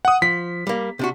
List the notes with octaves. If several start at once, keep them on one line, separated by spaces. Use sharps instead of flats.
F#5 D#6
F3 B6
G3 A#3
C3 D4 F#4